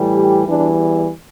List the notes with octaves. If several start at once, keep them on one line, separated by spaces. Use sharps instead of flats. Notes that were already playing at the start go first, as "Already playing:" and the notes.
Already playing: A2 E3 G3
G4
E2 E3 G3 D4